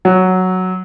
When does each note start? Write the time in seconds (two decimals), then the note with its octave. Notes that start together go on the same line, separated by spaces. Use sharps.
0.05 F#3